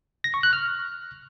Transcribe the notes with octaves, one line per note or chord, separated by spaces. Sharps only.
A#6
C#6
F#6
F6